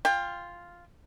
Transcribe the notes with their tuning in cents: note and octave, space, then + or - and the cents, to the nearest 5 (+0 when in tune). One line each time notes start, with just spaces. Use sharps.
F4 +0 G5 +25